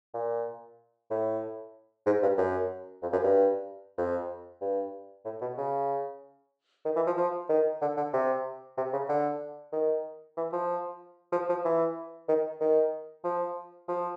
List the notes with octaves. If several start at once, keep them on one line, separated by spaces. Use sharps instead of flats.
A#2
A2
G#2
G2
F#2
F2
F#2
G2
F2
G2
A2
B2
C#3
D#3
E3
F3
F3
D#3
D3
D3
C3
C3
C#3
D3
D#3
E3
F3
F3
F3
E3
D#3
D#3
F3
F3